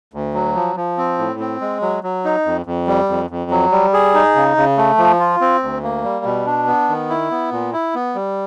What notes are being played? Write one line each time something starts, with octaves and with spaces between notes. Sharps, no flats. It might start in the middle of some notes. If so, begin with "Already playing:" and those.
D2
F#3
F3
F3
C4
A2
C4
G#3
F#3
F#3
D#4
F2
F2
G3
F2
F2
F#3
G3
G#4
D#4
C#3
C#3
A3
F3
F4
C4
D2
A#3
G3
B2
D4
B3
D#3
E4
B3
A#2
E4
B3
G3